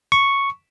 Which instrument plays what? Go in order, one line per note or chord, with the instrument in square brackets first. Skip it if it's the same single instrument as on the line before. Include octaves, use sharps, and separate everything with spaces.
[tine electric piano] C#6